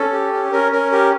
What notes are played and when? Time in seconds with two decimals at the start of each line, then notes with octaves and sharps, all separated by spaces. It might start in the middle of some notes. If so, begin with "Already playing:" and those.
Already playing: C#4 A4
0.13 G4
0.33 C#4
0.52 C#4 A#4
0.72 C#4 A#4
0.92 G4 A#4